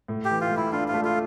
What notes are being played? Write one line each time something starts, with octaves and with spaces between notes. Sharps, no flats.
A2
G4
E3
F4
A2
E4
D4 F4
F4
A3
F4